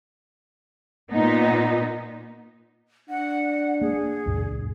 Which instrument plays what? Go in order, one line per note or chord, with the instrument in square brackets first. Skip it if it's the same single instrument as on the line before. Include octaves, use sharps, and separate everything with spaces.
[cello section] A#2 B3 D#4
[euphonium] D4 [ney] F#5
[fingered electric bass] A#3 [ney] G#4
[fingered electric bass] C#2 F#2 A#2